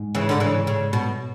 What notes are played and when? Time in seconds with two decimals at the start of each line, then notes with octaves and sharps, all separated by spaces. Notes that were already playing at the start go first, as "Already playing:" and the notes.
Already playing: G#2
0.15 C#3 E3
0.29 D3
0.40 C#3 E3
0.67 C#3
0.93 B2